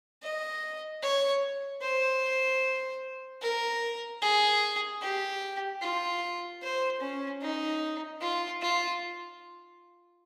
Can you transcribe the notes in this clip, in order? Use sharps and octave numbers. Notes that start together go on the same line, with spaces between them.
D#5
C#5
C5
A#4
G#4
G4
F4
C5
C#4
D#4
F4
F4